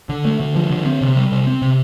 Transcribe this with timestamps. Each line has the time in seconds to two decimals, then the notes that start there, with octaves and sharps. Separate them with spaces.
0.09 D3
0.25 A3
0.40 D3
0.55 F3
0.70 D3
0.86 C4
1.01 C3
1.17 G3
1.32 C3
1.47 C4
1.62 C3